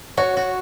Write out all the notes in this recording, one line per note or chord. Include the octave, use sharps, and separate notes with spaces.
F#4 C#5
F#4